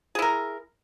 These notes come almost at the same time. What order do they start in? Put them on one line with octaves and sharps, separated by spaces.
G#4 E4 A#4